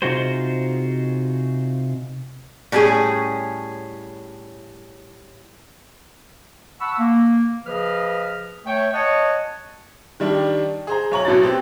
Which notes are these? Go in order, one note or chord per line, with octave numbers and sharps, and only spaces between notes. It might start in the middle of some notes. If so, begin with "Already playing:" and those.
C3 D#4 F4 F#4 G#4 C5
A2 G3 C#4 D4 G#4
F#5 A5 B5 C#6 E6
A#3
C#3 F3 B4 D#5 F6
A3 C#5 G5
C#5 D#5 F#5 G#5 A5 C#6
D#3 G3 D4
G#4 C5 A#5
B1 C#5 A#5 F#7
A1 B2 F#3 A6
B3 C4 G4